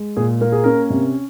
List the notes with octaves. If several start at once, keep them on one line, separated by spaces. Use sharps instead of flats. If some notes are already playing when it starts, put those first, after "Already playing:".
Already playing: G#3
A#2 G#4
A#3 A#4
G#4
C#4 A#4
C3